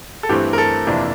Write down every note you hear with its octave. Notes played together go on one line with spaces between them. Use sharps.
A4
G2 E3 A3 C4 G4
A#4
A4
F2 C3 E3 A#3 D4